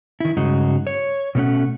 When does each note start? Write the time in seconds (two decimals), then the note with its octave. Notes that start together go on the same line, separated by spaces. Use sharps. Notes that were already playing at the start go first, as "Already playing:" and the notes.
0.20 D#3 E4
0.37 G2 C#3 G#3 D#4 F#4
0.87 C#5
1.35 B2 A3 C#4 F#5